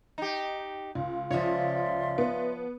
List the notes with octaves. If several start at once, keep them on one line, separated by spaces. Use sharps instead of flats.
D#4 G4
C#2 F4
C#2 F3 C#5 D5 E5 C6
B3